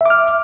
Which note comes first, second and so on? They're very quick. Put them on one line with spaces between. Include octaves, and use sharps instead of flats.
E5 D6 F6